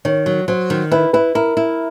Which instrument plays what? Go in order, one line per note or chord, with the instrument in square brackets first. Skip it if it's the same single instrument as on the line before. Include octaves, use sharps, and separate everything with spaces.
[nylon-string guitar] D#3 [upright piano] C#5
[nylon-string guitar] F#3
[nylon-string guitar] F#3 [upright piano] C5
[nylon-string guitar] D#3
[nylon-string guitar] E4 [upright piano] B4
[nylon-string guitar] E4 [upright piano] B4
[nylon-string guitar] E4 [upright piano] A#4
[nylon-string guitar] E4